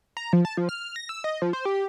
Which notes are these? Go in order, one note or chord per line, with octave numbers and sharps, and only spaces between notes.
A#5
F3
A5
F3
F6
A#6
E6
D#5
F3
C5
G4